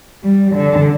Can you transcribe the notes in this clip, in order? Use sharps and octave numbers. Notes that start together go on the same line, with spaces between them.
G3
D3